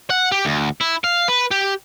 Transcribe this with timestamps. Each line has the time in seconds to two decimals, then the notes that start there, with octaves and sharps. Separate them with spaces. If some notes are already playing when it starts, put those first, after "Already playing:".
0.10 F#5
0.32 G4
0.45 D2
0.81 E4
1.04 F5
1.28 B4
1.51 G4